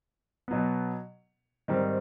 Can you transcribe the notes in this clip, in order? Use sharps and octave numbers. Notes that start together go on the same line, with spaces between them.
B2 F#3 B3
G#2 D#3 G3 C4